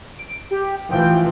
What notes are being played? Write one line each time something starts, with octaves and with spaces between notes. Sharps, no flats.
D7
G4
A1 E3 F3 G5